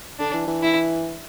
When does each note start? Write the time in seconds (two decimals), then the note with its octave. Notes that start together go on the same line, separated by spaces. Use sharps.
0.19 D3 D4
0.33 E3
0.47 E3
0.63 E4